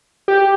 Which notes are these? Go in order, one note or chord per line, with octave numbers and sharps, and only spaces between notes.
G4